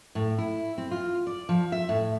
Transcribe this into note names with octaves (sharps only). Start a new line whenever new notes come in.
A2
E4
C4
F4
D5
F3
E5
A2